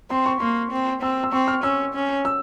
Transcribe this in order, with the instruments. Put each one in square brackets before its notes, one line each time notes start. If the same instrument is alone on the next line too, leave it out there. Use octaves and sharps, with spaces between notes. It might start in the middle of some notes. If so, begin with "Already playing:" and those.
[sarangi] C4 [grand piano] C6
[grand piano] C#6
[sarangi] A#3 [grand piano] C6
[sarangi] C4
[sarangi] C4 [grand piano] E6
[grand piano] E6
[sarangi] C4 [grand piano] C#6
[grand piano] F6
[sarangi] C#4 [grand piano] E6
[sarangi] C#4
[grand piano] E6